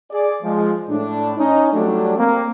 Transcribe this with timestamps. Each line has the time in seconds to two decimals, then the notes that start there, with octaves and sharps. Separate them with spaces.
0.11 G#4 D5
0.42 F3 G#3
0.89 A2 D4
1.38 C#4 D#4
1.72 F#3 G3 A3 D4
2.18 A#3 C4